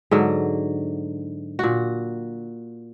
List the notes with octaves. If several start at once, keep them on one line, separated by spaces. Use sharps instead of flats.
G#2 D3 F#3
A#2 F#4